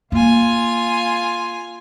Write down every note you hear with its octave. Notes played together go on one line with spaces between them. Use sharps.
A#3 F4 G#5